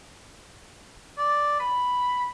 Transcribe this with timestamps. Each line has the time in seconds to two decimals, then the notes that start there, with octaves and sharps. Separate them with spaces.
1.18 D5
1.60 B5